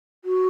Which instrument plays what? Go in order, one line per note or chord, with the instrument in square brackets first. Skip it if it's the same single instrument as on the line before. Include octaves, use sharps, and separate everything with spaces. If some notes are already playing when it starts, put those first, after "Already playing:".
[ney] F#4